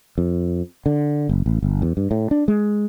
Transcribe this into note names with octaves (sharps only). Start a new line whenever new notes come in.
F2
D3
F#1
A1
G1
E2
G2
A2
D4
G#3